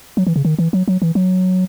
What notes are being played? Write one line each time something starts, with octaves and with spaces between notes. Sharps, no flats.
F#3
E3
C#3
D#3
E3
F#3
F#3
E3
F#3